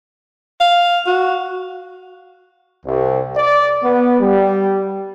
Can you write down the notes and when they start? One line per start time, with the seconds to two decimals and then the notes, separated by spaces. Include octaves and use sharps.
0.60 F5
1.07 F#4
2.85 C2
3.37 D5
3.83 B3
4.20 G3